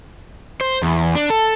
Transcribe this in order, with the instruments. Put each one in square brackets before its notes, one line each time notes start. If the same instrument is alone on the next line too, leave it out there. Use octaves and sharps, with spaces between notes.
[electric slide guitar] C5
E2
D4
A4